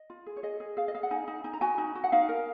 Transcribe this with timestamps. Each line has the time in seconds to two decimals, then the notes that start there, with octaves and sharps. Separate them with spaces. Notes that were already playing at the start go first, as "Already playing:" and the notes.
Already playing: D#5
0.10 F4
0.26 G#4
0.36 C#5
0.43 G#4 D#5
0.60 G#4
0.77 G#4 F5
0.88 D#5
0.94 G#4 F5
1.03 F#5
1.11 D#4 G#5
1.28 D#4
1.44 D#4 G#5
1.53 A#5
1.61 F#4 G#5
1.78 D#4
1.95 F#4
2.04 F#5
2.12 D#4 F5
2.29 A#4